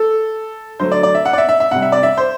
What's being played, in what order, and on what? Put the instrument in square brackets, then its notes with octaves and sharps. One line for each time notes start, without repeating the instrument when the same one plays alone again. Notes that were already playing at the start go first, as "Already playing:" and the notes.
Already playing: [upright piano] A4
D3 F#3 A3 C5
D5
D5
E5
F#5
D5
E5
E5
E5
C3 G3 F#5
E5
D5
E5
C5